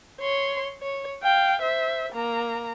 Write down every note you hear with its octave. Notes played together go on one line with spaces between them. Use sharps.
C#5 C6
C#5
F5 G5
C5 E5
A#3 A#5